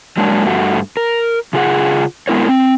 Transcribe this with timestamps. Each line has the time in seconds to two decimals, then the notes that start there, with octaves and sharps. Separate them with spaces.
0.17 F#3 G#3 A#3 D4 F#4
0.45 G2 A3 F#4
0.97 A#4
1.53 C#3 F4 G#4 F#5
2.28 G#3 A3 B3 E4 A#4 C#5
2.49 C4